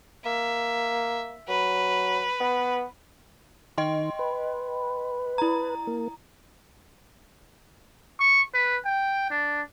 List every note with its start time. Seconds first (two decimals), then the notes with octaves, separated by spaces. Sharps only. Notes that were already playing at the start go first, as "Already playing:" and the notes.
0.25 A#3 E5
1.48 F#3 B4
2.40 B3
3.78 D#3 D#5 G5 C6
4.19 B4
5.38 E4 A#5
5.87 A#3
8.20 C#6
8.54 B4
8.85 G5
9.30 D4